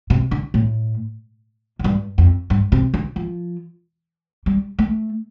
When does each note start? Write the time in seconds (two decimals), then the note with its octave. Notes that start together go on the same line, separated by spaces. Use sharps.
0.10 C3
0.31 D3
0.54 A2
1.79 F2
1.84 G2
2.18 F2
2.50 G2
2.72 C3
2.94 D3
3.16 F3
4.46 G3
4.79 A3